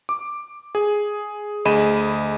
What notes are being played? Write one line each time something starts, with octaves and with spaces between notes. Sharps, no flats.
D6
G#4
D2 G#4 D#5 B5 D#7 E7